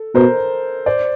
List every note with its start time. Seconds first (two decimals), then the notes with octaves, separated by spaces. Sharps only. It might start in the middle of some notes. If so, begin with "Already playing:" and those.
Already playing: A4
0.15 B2 A#4 C5
0.86 C5 D5